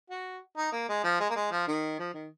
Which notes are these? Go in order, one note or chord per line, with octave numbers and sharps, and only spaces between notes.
F#4
D#4
A#3
G#3
F3
G#3
A#3
G#3
F3
D#3
F3
D#3